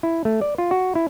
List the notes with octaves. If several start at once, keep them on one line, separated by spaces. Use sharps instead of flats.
E4
A3
D5
F4
F#4
E4